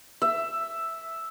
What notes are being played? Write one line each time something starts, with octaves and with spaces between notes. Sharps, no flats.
E5